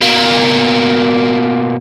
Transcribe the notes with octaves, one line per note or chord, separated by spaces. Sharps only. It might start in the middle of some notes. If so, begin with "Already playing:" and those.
B2 A#3